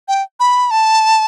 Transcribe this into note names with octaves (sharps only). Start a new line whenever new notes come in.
G5
B5
A5